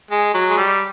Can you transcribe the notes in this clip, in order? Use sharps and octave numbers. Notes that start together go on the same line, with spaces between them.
G#3
F#3
G#3
G3